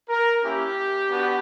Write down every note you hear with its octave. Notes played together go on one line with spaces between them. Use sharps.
A#4
A#3 C#4 E4 G4
B3 D4 F#4